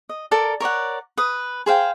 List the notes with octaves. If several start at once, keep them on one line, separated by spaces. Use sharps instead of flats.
D#5
A4 A#4 D5
A#4 C#5 D5 F#5
B4 D#6
G#4 C5 F5 G5